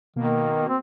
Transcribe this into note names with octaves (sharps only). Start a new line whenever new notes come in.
B2 D#3 A#3
C4